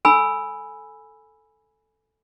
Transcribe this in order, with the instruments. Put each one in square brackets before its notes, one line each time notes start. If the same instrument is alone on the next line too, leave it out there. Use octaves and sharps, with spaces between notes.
[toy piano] A4 G#5 B5 E6